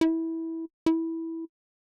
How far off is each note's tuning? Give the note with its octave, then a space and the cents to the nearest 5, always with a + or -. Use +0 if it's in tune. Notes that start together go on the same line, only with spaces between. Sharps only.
E4 -15
E4 -10